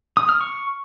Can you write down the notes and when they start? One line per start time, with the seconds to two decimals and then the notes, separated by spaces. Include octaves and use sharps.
0.17 D#6
0.29 F6
0.41 C#6